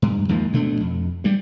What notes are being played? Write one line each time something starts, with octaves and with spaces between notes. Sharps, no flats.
G2
D#2 G#2 F3 A#3
D2 B2 A3 D4
F2
G2 G3